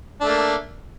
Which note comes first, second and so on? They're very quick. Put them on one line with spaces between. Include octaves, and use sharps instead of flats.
D4 A3 A#3